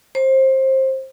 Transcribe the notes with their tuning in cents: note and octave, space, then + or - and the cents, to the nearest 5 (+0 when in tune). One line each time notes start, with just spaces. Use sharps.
C5 +25